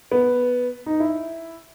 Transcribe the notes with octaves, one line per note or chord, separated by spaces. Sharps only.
B3
D#4
E4